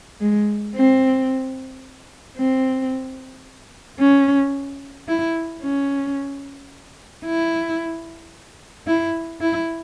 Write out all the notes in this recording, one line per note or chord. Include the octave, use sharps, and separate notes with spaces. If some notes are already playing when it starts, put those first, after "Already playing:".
G#3
C4
C4
C#4
E4
C#4
E4
E4
E4